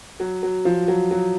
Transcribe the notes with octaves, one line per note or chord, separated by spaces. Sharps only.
F#3
F#3
F3
F#3
F#3